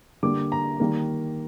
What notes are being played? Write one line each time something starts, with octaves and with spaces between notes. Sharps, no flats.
D3 G3 A#3 D6
A#5
D#3 G3 A#3